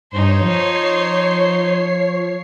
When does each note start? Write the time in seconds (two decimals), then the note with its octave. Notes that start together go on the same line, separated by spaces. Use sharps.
0.12 G2 D#4 C5 C#5
0.42 F3 C#5 C7